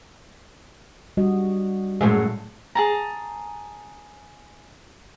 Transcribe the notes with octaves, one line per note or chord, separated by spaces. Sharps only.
G3 F#4 D#5
F#2 A2 G#3
G#4 A5 A#5